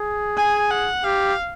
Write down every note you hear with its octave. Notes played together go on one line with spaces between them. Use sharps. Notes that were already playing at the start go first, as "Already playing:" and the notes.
Already playing: G#4
G#5
F#5
G4 F5